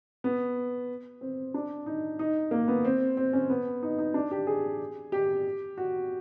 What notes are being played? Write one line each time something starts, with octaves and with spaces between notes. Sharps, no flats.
B3
C4
D4
D#4
D#4
A#3
B3
C4
C4
C#4
B3
D#4
D#4
D4
G4
G#4
G4
F#4